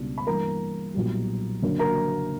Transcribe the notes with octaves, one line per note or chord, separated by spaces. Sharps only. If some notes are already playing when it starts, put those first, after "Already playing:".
Already playing: C#2 B2 G3 B3 D4
B5
G2 E3 A#3 A#4 A#5
B1 A#2 G3
F#1 F#2 D3 F#3 A#3
A#4 A#5